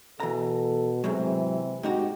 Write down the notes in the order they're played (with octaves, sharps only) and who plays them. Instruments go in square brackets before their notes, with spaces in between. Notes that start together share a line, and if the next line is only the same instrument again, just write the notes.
[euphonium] B2 [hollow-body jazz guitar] E3 A#5 [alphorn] A4
[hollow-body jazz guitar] E2 G#2 F#3 [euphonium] C3 [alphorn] E3
[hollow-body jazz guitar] G#2 D#4 F#4 [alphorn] G4